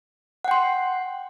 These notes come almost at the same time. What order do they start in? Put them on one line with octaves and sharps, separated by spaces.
F#5 G5 C6